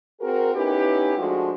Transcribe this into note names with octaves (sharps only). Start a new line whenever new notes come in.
C4 F#4 G#4 A#4
B3 C#4 D#4 E4 G4 B4
F3 G#3 A3 D4 F#4